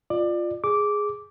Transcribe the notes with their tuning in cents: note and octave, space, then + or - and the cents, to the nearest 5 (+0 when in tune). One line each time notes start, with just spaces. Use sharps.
F4 +0 D5 +25
G#4 +0 D6 -10